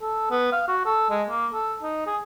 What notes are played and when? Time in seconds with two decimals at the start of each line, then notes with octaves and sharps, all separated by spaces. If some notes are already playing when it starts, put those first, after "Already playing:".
0.01 A4
0.30 B3
0.52 F5
0.67 F#4
0.85 A4
1.10 G#3
1.29 A#3
1.53 A4
1.82 D#4
2.07 G#4